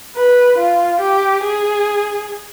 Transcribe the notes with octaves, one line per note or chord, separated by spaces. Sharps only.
B4
F4
G4
G#4